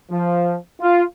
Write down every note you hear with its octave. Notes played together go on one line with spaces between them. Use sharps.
F3
F4